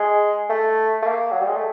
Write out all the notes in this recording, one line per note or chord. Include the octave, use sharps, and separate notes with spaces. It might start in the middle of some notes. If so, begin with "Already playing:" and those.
Already playing: G#3
A3
A3
A#3
F#3
G3
G#3
A3